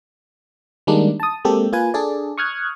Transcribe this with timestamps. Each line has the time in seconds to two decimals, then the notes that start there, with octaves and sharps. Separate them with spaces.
0.87 D#3 G3 G#3 A#3 D4 D#4
1.20 A5 D#6
1.45 G#3 A#3 C4 G4 A4
1.72 A#3 F4 B4 G#5
1.94 D4 G#4 A4 D5
2.38 C#6 D#6 F6 F#6 G#6